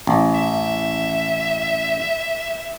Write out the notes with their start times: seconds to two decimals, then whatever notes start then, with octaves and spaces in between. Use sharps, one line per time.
0.07 A1
0.34 E5